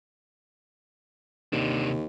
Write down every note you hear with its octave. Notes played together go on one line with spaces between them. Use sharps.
D#2 C3 D4